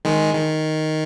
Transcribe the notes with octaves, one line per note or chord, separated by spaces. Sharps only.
D#3 G#3
D#3